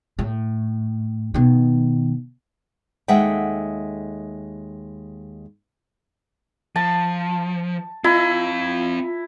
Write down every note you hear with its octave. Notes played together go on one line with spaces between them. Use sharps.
A2
B2 D#3
D#2 G#3 A4 E5 F#5 G5
F3 A5
C4 E4 F4 F5